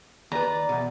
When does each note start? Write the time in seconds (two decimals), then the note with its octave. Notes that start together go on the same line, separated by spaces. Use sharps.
0.32 D#2 B4 D5 A#5
0.48 D5
0.69 E2 B2